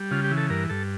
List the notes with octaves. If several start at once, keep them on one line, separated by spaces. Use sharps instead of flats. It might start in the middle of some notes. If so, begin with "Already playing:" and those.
Already playing: G3
C#3 F4
G4
E3
A4
G2 A#4
G2 A4